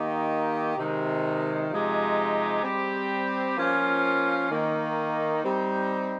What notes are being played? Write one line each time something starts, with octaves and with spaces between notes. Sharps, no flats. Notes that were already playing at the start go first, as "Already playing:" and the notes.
Already playing: D#3 A#3 D#4 G4
C3 D#3 G#3
C3 F3 G#3 D#4 G4
G3 C4 G4
F3 A#3 C#4 F4
D#3 A#3 D#4
G3 C4 D#4